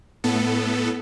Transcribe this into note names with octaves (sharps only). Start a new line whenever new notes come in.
A2 B3 A4